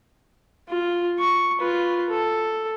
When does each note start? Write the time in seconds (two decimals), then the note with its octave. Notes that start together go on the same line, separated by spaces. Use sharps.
0.69 F4
1.19 C#6
1.60 F4 B4
2.10 A4